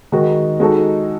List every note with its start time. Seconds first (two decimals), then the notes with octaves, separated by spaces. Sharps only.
0.12 D#3 G#3 D#4 F#4
0.60 G#3 D#4 F#4 A4